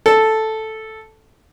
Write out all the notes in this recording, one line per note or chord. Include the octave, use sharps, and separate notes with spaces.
A4